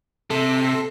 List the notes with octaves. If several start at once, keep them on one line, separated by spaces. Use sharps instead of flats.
C3 A4